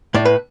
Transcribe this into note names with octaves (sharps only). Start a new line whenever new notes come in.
A2 D5
B4